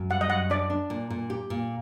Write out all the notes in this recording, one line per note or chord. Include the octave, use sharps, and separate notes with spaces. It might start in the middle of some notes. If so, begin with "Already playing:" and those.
Already playing: F#2
G3 F#5
D#5
F#2 F#5
D4 D5
D4
A#2
A#2
G4
A#2